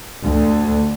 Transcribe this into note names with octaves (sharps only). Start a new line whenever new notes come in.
D2 D3